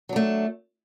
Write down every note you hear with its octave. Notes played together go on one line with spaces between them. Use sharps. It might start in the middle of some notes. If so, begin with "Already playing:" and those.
F#3 A3 D4